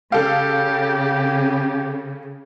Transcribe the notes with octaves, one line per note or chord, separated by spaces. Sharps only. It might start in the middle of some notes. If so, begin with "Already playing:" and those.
C#3 G4 A4 F5